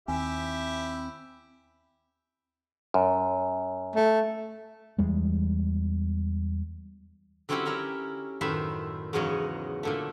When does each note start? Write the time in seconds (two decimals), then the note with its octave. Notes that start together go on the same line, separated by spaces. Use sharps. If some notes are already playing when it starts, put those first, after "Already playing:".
0.08 D#2 C4 E4 G4 E5 G#5
2.94 F#2
3.95 A3
4.98 E2 G3 G#3
7.49 D3 F#3 C4 C#4 E4 G4
7.65 E4 A#4 C#5 G5
8.41 F#2 A2 D#3 B4 C5 E5
9.13 E2 G#2 C#3 F#3 C#5 D#5
9.83 A#2 D3 A3